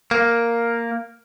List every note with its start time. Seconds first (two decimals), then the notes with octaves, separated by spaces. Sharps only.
0.11 A#3